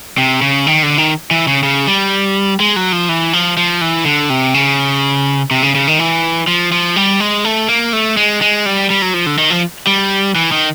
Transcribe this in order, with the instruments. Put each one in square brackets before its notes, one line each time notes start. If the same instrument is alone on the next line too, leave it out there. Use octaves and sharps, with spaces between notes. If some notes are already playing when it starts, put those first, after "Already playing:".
[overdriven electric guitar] C3
C#3
D#3
D3
D#3
E3
C#3
C#3
G3
G#3
F#3
F3
E3
F3
F3
E3
D3
C3
C#3
C3
C#3
C#3
D#3
E3
F3
F3
G3
G#3
A3
A#3
A3
G#3
G#3
G3
G3
F#3
F3
D3
D#3
F3
G3
E3
D#3